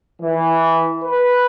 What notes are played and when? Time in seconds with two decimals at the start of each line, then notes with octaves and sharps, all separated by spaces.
0.21 E3
1.03 B4